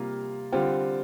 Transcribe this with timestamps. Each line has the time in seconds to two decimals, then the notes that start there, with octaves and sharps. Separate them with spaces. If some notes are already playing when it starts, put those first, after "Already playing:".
Already playing: C3 G3 A#3 F4
0.52 D3 G3 C4 F4